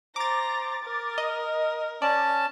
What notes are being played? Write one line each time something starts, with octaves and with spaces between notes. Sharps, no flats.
C5 A#5 D6 A6
A#4
D#5
C#4 D5 A5